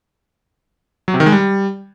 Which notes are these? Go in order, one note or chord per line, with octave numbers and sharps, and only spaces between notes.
F#3
C3
D#3
G#3
G3